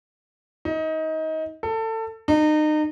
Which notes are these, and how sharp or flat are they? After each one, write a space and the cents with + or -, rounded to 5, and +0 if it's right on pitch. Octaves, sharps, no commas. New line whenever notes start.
D#4 +25
A4 +25
D#4 -30